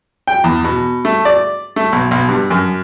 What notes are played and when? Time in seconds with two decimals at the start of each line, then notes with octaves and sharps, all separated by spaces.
0.27 G5
0.44 E2
0.64 B2
1.05 A3
1.25 D5
1.76 A3
1.92 B1
2.11 B1
2.29 G2
2.50 F#2